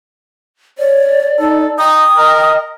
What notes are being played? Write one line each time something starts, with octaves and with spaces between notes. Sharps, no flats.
C#5 D5
D#4 A4
D#4 G5 D#6
A#4 D#5